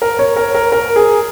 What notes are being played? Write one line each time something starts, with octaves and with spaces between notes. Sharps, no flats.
A#4
C#5
A#4
A#4
A#4
G#4